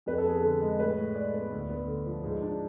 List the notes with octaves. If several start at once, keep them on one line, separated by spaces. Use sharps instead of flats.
F2 B4
A4
B3 G#4
D3 A4
G#3
A2 B4
A2
G#3 D5
B3
D2
B3
D3
F3
G#2
D4